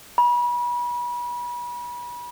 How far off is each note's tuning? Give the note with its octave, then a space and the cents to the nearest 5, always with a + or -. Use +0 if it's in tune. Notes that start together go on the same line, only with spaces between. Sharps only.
B5 -35